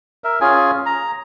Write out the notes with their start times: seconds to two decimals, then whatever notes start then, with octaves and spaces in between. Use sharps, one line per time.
0.24 A#4 E5
0.41 C#4 F4 G#4 G#5
0.86 A#5